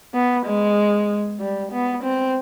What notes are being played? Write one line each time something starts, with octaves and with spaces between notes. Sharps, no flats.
B3
G#3
G3
B3
C4